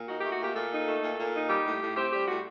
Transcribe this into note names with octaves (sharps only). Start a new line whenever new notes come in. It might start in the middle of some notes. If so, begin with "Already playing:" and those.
Already playing: A#2
D#4 F#4
A3 G4
F#4
A#2 G4
A#2 A4
D#4
A3
A#2
A#2
D#4
G3 G4
A2
A2
C4 G4
G3 G4
A2 F#4